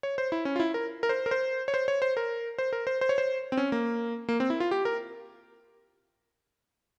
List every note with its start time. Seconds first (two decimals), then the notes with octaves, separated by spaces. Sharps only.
0.03 C#5
0.18 C5
0.32 E4
0.45 C#4
0.56 F4
0.60 E4
0.74 A#4
1.03 A#4
1.09 C5
1.26 A#4
1.31 C5
1.68 C#5
1.74 C5
1.88 C#5
2.02 C5
2.17 A#4
2.58 C5
2.73 A#4
2.87 C5
3.01 C5
3.09 C#5
3.18 C5
3.52 C4
3.57 C#4
3.72 A#3
4.29 A#3
4.40 C4
4.50 E4
4.60 F4
4.71 G4
4.85 A#4